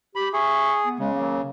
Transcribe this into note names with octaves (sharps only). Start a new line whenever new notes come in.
G4 B5
G#4 E5 C#6
B3
C#3 G#3
D#3 F#3 A#3